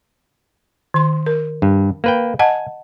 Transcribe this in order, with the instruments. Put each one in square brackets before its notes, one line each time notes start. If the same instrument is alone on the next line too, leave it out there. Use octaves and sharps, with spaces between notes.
[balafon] D#3 C6
A#4
[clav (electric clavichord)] G2
A#3 B4 G5
[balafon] D#5 F#5 A5 [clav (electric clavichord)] G#5